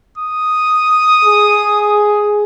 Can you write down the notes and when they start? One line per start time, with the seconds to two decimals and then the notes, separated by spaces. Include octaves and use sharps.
0.18 D#6
1.25 G#4